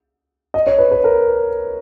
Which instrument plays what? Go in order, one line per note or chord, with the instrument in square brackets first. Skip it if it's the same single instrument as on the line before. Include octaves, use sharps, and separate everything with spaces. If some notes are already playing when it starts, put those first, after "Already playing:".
[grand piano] D#5
C#5
B4
B4
A#4